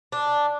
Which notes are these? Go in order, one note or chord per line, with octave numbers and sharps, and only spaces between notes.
D4